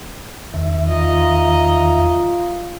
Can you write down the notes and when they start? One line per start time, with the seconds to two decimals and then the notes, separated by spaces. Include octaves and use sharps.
0.54 E2 D#3 E5
0.89 F4 D#5 A#5